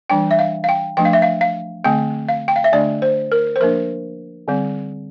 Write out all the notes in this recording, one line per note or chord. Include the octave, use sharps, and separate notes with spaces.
E3 G3 D4 G5
E5
F5
F5
G5
F3 A3 D4 G5
F5
E5
F5
F5
D3 A3 C4 G5
F5
G5
F5
E5
D3 A3 D4 D5
C5
A#4
C5
F3 A#3 D4 A#4
D3 G3 C4